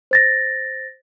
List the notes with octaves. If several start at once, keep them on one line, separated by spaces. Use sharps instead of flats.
C5 A6 A#6